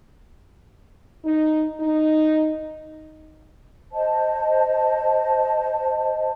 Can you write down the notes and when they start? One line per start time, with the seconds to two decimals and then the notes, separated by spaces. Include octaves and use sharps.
1.24 D#4
1.80 D#4
3.93 C5 D#5 A5